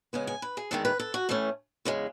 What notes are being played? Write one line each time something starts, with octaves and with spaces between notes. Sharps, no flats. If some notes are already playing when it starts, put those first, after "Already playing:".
C#3 G#3 B3 G#5
G#5
B4
G#4
E2 D#3 G#3 A4
B4
A4
F#4
A2 E3 A3 C#4
E2 C#3 G#3